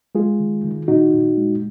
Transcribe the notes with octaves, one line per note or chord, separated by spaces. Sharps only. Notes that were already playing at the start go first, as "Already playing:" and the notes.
G#3 F4 G#4
D#3
D#3
A#2 D#4 F#4
A#2
G#3